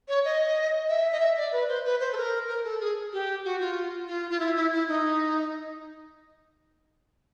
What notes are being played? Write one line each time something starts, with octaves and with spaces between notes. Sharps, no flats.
C#5
D#5
E5
D#5
E5
D5
B4
C5
B4
C5
A4
A#4
A#4
A4
G#4
G4
F#4
F4
F4
F4
E4
E4
E4
D#4